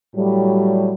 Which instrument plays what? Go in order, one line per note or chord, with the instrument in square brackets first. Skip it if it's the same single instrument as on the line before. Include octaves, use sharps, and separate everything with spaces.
[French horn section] A2 F#3 G3